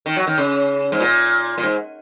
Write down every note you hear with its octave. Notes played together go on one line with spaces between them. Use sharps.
D#3
F#3
D#3
C#3
G#2
A#2
A#2
G#2